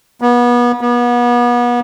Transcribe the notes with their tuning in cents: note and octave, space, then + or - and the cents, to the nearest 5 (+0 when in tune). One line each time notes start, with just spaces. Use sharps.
B3 -30
B3 -35